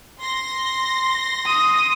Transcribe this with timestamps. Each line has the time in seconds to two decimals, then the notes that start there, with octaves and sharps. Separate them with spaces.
0.20 C6 A#6
1.46 D#6